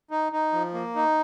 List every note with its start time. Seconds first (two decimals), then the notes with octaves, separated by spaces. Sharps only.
0.11 D#4
0.32 D#4
0.53 F3
0.74 A#3
0.96 D#4